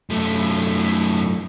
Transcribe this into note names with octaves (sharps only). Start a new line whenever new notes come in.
F#2 A3